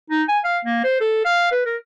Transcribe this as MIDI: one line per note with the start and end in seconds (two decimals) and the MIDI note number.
0.10 0.23 63
0.29 0.39 80
0.45 0.58 77
0.65 0.80 58
0.84 0.99 72
1.01 1.22 69
1.25 1.49 77
1.52 1.63 71
1.66 1.77 70